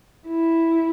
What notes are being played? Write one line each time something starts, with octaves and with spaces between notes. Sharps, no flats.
E4